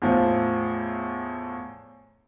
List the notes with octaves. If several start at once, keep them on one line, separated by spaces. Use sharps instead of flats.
E2 A2 F3